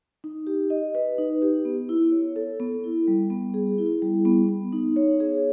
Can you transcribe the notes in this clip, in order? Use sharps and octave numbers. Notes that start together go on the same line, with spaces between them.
D#4
G4
D#5
B4
D#4
G4
B3
E4
C#5
A4
B3
E4
G3
B3
G#4
E4
G3
B3
B3
D#4
C#5
G#4